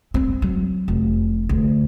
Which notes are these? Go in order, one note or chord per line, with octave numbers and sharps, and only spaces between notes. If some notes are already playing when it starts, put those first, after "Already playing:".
C4
F#3
F1
D2